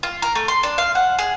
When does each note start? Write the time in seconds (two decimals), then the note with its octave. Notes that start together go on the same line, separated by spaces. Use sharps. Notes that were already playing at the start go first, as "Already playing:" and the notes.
0.03 F4
0.22 A#4
0.35 A3
0.48 C6
0.63 D4
0.78 F5
0.95 F#5
1.19 G#4